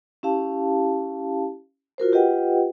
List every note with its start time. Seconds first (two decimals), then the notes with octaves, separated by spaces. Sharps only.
0.23 C#4 E4 G4 F5 A5
1.98 F4 F#4 A#4 C5
2.12 F4 G4 B4 D#5 F#5 G5